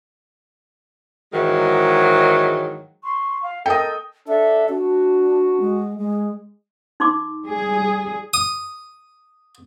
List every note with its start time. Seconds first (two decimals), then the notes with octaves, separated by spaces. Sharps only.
1.33 G#2 D#3 E3 F#3 G#3
3.04 C6 C#6
3.42 F5
3.66 A4 A#4 D#5 G5 D#6
4.28 D4 A4 E5
4.69 D4 F#4
5.60 G#3
5.98 G#3
7.00 D#4 C6 D6
7.43 G3 G#4
8.34 D#6